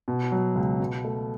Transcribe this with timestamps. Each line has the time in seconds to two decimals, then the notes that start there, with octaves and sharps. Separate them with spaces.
0.08 B2
0.32 F#3
0.56 C#2
0.80 B2
1.05 A3